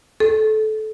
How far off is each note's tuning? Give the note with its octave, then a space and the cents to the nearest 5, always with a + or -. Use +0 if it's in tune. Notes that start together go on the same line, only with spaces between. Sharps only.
A4 -20